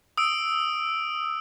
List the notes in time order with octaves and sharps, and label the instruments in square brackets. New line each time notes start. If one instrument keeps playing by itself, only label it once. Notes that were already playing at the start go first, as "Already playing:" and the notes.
[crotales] D#6 E6 D7